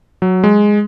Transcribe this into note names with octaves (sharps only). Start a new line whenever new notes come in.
F#3
G#3